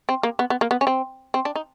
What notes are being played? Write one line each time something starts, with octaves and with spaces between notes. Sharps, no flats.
C4
A#3
B3
B3
A#3
B3
C#4
C4
C4
D4
D#4